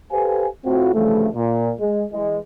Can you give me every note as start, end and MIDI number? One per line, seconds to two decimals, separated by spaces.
0.12 0.46 67
0.12 0.46 69
0.12 0.46 71
0.12 0.46 72
0.12 0.46 77
0.12 0.46 80
0.65 0.91 45
0.65 0.91 60
0.65 0.91 65
0.65 0.91 66
0.94 1.28 36
0.94 1.28 43
0.94 1.28 49
0.94 1.28 52
0.94 1.28 53
0.94 1.28 57
1.35 1.72 46
1.80 2.04 56
2.12 2.37 52
2.12 2.37 56